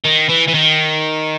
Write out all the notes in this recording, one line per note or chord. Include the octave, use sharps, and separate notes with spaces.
D#3
E3
E3
D#3